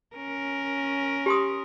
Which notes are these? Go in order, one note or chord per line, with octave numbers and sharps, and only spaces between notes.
C#4 A#4
G4 C6 D#6